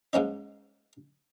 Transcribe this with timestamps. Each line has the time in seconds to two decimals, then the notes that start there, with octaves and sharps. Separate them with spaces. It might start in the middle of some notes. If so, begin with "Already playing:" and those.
0.13 G#2 A#3 C#4 D#4